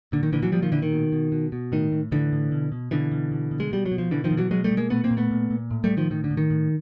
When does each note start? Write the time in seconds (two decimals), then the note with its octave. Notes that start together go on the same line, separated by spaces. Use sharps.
0.12 A#2 D3
0.23 D#3
0.32 A#2 D3 E3
0.42 E3 F#3
0.52 A#2 F3 G3
0.62 D#3 F3
0.72 A#2 D3 E3
0.82 D#3
0.92 B2
1.12 B2
1.32 B2
1.52 B2
1.72 A2 D#3
1.92 A2
2.12 A2 D3 E3
2.32 A2
2.52 B2
2.72 B2
2.91 B2 D3 E3
3.12 B2
3.31 B2
3.51 B2
3.60 G#3
3.71 B2 G3
3.86 F#3
3.91 B2
3.98 F3
4.11 B2 D3 E3
4.24 D#3 F3
4.31 B2
4.37 E3 F#3
4.51 B2 F#3 G#3
4.64 G3 A3
4.71 B2
4.77 G#3 A#3
4.90 A#2 A3 B3
5.04 A#3 C4
5.11 A#2
5.17 A3 B3
5.31 A#2
5.50 A#2
5.71 A2
5.84 G3 A3
5.91 A2
5.97 D#3 F3
6.10 A2 D#3
6.24 D3
6.31 A2
6.37 D#3
6.50 A2